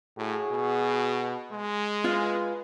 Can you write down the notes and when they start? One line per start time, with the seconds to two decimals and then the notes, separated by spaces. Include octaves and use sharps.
0.17 A2 F#4 G#4
0.51 B2
1.52 G#3
2.04 F4 B4